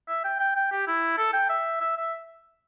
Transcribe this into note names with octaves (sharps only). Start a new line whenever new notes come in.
E5
G5
G5
G5
G4
E4
A4
G5
E5
E5
E5